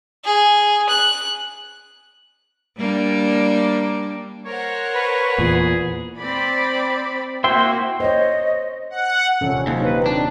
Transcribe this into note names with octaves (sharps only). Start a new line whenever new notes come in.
G#4
F#6
G3 A#3 D4
A#4 C5 C#5 F#5
B4
E2 A#2 G#4
C4 D5 B5
A#3 E4 F#4 C5 E5 G5
C5 C#5 D#5
F#5
D#1 C3 C#4 A4
G5 C#6
D#2 F#3 C5
D#4 B4 G5
C4 D4